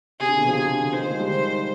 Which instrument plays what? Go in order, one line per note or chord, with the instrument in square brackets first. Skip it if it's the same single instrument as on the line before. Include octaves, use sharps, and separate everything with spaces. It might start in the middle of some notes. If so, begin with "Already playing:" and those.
[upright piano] C3 [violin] G#4
[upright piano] D3
B2
F3
[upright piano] C3 [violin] G#4
[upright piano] D3
[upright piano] D#3 [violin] C5
[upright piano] F3
G#3
G3
[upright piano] D#3 [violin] C5